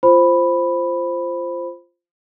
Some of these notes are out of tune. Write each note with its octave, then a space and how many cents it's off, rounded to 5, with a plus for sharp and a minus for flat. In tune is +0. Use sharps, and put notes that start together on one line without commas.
F4 -10 C5 +0 B5 +0